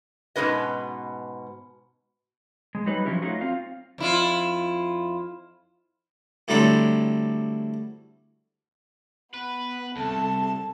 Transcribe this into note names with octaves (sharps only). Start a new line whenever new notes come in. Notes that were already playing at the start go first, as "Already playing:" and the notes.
G#2 B2 C#4 B4 D#5
G#3
F#3 G3 D#4 B4
F3 F#3 C#4 E4 F4 G4
F#3 A3 D#4 F4 F#4
C4 F4 F5
F2 E4 F4
A2 D3 F#3 G3 C4 D4
B3 B4
C2 A4 A5